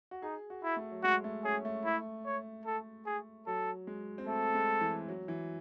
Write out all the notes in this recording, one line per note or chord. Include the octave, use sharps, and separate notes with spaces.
F#4
D#4 G#4
F#4
E4
A3
F#3
G#3 F#4
A3
C#4 G#4
A3
E4
C#5
A4
G#4
F#3 A4
G#3
C4
A3 A4
G#3
E3
F#3
E3